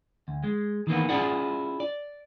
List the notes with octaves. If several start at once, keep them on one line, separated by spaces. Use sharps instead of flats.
D2
G#3
D#3 E3 A#3 B3
C#4 E4 F4 G#4 D5 F#5
D5